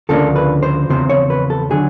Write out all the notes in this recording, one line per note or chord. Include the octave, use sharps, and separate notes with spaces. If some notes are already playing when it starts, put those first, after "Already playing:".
D2 C#3 F3 A#3 D4 A4
B4
C5
E2 C#3 F3 C4 C5
C#5
B4
A4
D3 F#3 G#4